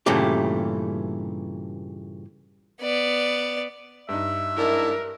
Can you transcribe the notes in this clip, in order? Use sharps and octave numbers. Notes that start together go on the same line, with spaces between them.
G2 A#2 C#3 E3 A3 G4
B3 D5
G2 D#4 E5
G#2 D4 E4 A#4